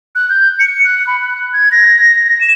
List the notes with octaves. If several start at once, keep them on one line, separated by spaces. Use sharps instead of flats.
F#6
G6
C#7
F#6
B5
F#6
G#6
A#6
E7